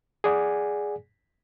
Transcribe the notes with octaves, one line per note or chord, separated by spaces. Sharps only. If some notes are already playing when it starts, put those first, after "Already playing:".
G#4 D5 F#5 G#5